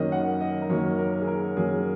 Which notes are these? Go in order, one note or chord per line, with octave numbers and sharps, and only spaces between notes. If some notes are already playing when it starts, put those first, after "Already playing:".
Already playing: F#2 D#3 A#3 C#4 D#5
F#5
D#5
A#4
F#2 D#3 A#3 C#4 C#5
A#4
G#4
A#4
F#2 D#3 A#3 C#4 G#4